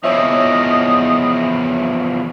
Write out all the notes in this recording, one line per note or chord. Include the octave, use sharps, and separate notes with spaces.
E2 F3 C#5 D#5 E5